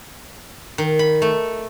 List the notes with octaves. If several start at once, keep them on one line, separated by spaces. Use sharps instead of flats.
D#3
B5
A3